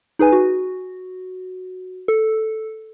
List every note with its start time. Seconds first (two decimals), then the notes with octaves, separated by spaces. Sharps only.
0.19 D#4 G#4 B4 G#5
0.32 F#4
2.08 A4